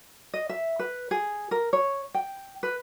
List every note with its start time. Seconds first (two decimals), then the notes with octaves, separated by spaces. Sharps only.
0.34 D#5
0.49 E5
0.79 B4
1.11 G#4
1.51 A#4
1.73 C#5
2.14 G5
2.63 B4